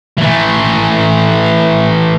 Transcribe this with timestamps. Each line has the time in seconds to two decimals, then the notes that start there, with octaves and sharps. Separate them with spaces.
0.18 E3 A3